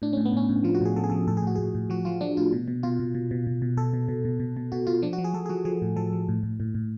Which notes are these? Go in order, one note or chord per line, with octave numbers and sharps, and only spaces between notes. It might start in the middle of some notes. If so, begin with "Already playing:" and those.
A2 D4
A2 C#4
B3
A2 C#4
A2
F3 F4
F#4
A2
G#4
F3 A4
G#4
F3 A4
A2 A4
G#4
A2 F#4
A2 G#4
A2
F3 F#4
F3 F4
F3 D4
A2 F4
B2
B2
B2 F4
B2
B2
B2
B2
B2
B2 A4
B2
B2
B2
B2
B2
B2 F#4
B2 F4
F3 D4
F#4
F3
G#4
F3 A4
G#4
F3 F#4
F3 G#4
A2
F3 A4
F3
A2
A2
A2
A2